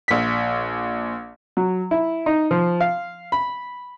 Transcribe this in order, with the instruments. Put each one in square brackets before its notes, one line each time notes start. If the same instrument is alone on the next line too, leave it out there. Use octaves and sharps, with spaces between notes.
[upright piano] A#1 B6
[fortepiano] F#3
E4
D#4
F3
F5
B5